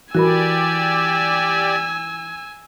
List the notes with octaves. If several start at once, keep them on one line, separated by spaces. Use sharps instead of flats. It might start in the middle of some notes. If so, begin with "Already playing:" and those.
E3 F#4 G4 A#4 D5 G#5 B5 E6